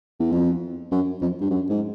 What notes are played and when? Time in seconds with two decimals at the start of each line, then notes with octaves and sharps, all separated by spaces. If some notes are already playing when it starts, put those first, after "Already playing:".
0.20 E2
0.32 F2
0.92 F#2
1.22 F2
1.41 G2
1.50 F#2
1.70 G#2